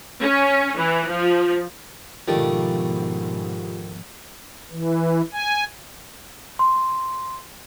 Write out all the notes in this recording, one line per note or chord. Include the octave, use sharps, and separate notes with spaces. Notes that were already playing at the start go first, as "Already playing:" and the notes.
C#4
E3
F3
G#2 B2 D#3 F3 A3 D4 F4 G4
E3
G#5
C6